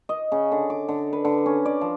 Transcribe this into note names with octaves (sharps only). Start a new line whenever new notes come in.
D#5
C#3
D3
D6
D3
B4
D3
C#4
D5
F3